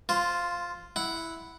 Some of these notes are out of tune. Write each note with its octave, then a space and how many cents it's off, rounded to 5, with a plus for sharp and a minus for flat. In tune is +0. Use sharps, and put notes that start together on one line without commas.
F4 +0 C5 -15
E4 +0 F#5 +0